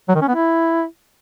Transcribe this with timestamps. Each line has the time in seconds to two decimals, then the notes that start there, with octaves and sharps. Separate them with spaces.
0.09 F#3
0.15 D#3
0.22 C#4
0.28 B3
0.35 E4